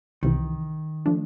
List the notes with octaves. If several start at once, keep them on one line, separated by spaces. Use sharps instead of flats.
C2 C3 D#3 E3
F3 A3 D4